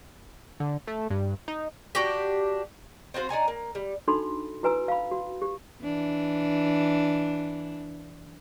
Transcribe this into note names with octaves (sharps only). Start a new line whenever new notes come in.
D3
A3
G2
D#4
D4 F#4 G4
C4 F4 F#4 C5
D4 D#4 G#5 A#5
A#3
G3
D4 D#4 F#4 A4 B5 C6
E4 F#4 B4 G#5 A#5 E6
F5 B5
F#4
G4
E3 D4